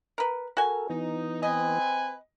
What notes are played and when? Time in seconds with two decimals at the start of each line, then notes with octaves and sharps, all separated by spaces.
0.18 A#4 B4
0.57 F#4 A4 A#4 G#5
0.90 E3 B3 D#4
1.43 C4 B4 D#5 G#5